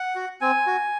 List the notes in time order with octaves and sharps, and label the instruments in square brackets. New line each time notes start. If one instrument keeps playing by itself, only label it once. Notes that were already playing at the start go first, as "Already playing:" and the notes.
Already playing: [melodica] F#5
F#4
C4 G#5
F#4